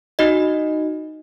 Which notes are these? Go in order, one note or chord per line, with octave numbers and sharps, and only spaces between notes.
D#4 F#4 D#5